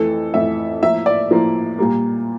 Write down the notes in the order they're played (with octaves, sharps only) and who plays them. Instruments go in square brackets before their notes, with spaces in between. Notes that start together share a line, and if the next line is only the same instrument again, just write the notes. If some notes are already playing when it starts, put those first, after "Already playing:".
Already playing: [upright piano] F2 E3 A3 A4
F2 E3 A3 E5
A2 F3 A#3 E5
D5
A2 F3 A#3
A#2 G3 A#3